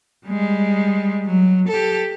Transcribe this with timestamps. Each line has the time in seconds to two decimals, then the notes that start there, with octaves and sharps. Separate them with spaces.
0.26 G3 G#3
1.26 F#3
1.68 G4 A4